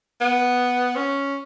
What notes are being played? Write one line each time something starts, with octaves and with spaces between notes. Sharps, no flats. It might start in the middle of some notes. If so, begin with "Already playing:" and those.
B3
C#4